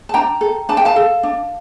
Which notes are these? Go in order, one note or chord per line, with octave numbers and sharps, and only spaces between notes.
A5
D4 G5 A#5
A4
D4 A5
G5
F5 A5
A4
D4